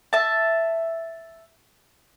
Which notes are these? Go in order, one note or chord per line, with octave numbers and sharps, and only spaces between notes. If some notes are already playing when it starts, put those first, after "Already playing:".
E5 A5